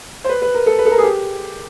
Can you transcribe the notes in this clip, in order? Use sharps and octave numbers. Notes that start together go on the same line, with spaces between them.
C5
B4
B4
A#4
A4
B4
A4
A#4
G#4
G4